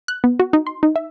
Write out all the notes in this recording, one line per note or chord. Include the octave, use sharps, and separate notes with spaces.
F#6
B3
F#4
D#4
C6
D#4
E5